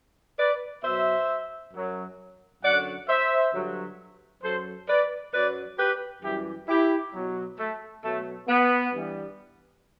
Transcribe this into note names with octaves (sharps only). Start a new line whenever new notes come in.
B4 D5
B2 F#3 C5 E5
F#2 F#3
F#2 D3 F#3 D5 F#5
C5 E5
G2 D3 F#3
F#2 F#3 A4 C5
B4 D5
F#2 F#3 B4 D5
G4 B4
F#2 E3 G3 E4 G4
E4 G4
B2 F#3
A3
B2 F#3 A3
B3
G2 E3 G3